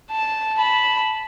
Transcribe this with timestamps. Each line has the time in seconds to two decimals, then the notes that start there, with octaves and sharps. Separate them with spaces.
0.11 A5
0.58 A5 B5